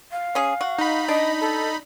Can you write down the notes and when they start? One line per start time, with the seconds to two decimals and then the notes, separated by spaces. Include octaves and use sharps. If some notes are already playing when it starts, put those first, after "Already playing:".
0.11 F5
0.35 C#4 G#4
0.61 F#4
0.78 D#4 B5
1.08 D4 D#5
1.41 A4